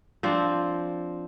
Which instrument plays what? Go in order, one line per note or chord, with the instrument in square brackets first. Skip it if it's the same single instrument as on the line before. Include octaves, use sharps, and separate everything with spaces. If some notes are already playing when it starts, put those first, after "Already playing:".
[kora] F3 C4 D4